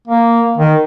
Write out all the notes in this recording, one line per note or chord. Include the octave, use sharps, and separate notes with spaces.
A#3
D#3